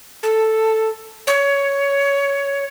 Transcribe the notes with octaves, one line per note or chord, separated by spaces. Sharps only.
A4
C#5